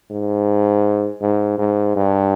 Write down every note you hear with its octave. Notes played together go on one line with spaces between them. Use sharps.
G#2
G#2
G#2
G2